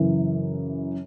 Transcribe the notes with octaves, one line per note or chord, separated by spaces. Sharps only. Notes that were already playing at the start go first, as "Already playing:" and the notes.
Already playing: F#2 C#3 E3